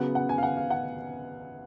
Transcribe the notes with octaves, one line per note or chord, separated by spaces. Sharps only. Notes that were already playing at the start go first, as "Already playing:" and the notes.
Already playing: C#3 F#3 B3 F#5
F#5
G#5
F5
F#5
F5
F#5